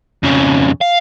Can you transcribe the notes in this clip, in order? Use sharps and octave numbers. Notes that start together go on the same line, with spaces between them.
F2 C#3
F5